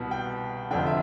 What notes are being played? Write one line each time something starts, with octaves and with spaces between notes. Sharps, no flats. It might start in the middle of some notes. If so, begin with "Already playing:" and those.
Already playing: C2 B2 B3
G5
F1 F2 D3 G5
E5